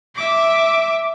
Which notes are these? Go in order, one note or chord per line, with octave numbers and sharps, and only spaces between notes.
E5 D6